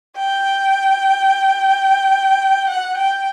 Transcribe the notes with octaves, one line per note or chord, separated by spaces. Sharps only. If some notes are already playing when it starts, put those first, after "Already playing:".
G5
F#5
G5